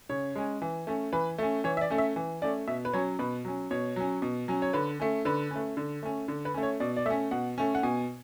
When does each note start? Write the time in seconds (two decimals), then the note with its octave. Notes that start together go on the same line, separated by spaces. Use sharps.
0.09 C#3 C#5
0.35 G#3 C#4
0.62 E3
0.87 A3 C#4
1.13 E3 B4
1.38 A3 C#4
1.64 E3 C#5
1.77 E5
1.81 D5
1.90 A3 C#4
1.98 E5
2.16 E3
2.42 A3 C#4 D5
2.67 B2 E5
2.85 B4
2.93 F#3 C#4 C#5
3.19 B2 B4
3.45 F#3 C#4
3.71 B2 C#5
3.96 F#3 C#4
4.22 B2
4.48 F#3 C#4
4.62 C#5
4.73 D3 B4
5.00 A3 C#4
5.25 D3 B4
5.51 A3 C#4
5.77 D3
6.03 A3 C#4
6.28 D3
6.45 B4
6.54 A3 C#4
6.63 C#5
6.80 B2 D5
6.96 D5
7.06 A3 E5
7.10 C#4
7.31 B2 F#5
7.58 A3 C#4
7.75 F#5
7.83 B2 G#5